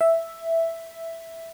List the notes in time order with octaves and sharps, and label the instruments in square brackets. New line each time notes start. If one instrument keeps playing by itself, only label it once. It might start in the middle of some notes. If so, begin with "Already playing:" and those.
[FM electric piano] E5